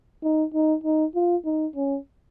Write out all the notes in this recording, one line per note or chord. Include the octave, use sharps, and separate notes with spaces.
D#4
D#4
D#4
F4
D#4
C#4